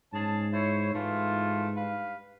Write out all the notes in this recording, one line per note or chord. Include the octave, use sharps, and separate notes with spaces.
G#2 C#4 G#4 A5
E4 C5 C#5
G#2 E3 A3 F4
G2 B4 F5